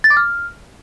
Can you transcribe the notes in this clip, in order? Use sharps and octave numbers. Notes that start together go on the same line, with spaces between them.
A6
D6
F6